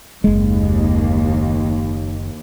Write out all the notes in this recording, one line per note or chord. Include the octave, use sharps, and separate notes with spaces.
F#1 D#2 G#3